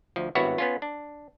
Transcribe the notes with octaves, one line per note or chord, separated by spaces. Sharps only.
D2 F3
G#1 G2 B3 E4 F#4 C#5
B3 C#4 F4
D4